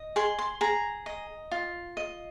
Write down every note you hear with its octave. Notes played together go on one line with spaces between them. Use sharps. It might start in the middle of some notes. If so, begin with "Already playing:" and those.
Already playing: D#5
G#4 C6
C6
G#4 A#5
D#5
F4
D#5